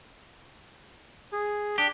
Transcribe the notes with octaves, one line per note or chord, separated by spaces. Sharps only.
G#4
D4 G4